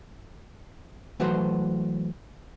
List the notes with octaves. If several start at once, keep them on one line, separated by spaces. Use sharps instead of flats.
E3 F#3 A3 F#4 B4 C5